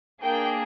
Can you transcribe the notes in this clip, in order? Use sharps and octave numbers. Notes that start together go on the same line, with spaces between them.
A#3 D4 G#4 G5